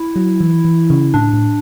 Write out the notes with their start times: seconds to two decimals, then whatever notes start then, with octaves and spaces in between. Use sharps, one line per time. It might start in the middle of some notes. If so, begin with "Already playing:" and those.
Already playing: E4
0.16 F#3
0.40 E3
0.65 E3
0.90 C#3
1.14 A2 D4
1.33 A2